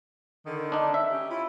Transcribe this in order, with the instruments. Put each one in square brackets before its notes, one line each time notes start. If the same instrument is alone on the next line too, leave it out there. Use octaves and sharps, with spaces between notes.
[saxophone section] D3 D#3
[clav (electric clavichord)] D4 D#4
E5
[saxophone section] C#4 G4
E4 F4